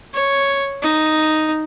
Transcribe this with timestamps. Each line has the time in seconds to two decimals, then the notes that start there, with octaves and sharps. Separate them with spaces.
0.14 C#5
0.83 D#4